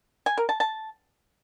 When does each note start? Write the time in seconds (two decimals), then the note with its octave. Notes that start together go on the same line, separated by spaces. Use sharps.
0.26 G#5
0.38 A#4
0.49 A5
0.60 A5